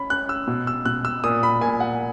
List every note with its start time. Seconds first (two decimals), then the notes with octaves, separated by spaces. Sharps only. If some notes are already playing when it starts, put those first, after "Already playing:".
Already playing: C#4 B5
0.10 C#4 F#6
0.29 E6
0.48 B2
0.67 E6
0.85 B2 F#6
1.05 E6
1.24 A#2 D#6
1.43 B5
1.61 A#2 G#5
1.80 F#5